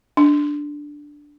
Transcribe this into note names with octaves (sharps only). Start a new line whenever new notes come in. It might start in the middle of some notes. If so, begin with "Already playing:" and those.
D4